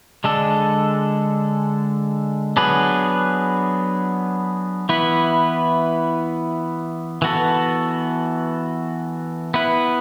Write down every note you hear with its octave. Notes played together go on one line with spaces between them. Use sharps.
D3 G#3 D4 A4
F#3 B3 D4 G#4 B4
E3 B3 E4 B4
E3 B3 F#4 A4
B3 E4 B4